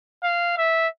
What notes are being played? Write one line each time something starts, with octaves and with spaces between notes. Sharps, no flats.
F5
E5